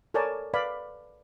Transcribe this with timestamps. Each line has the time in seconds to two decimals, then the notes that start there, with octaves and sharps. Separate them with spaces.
0.14 A4 A#4 C#5 D5 G#5 A5
0.54 B4 D5 F5 B5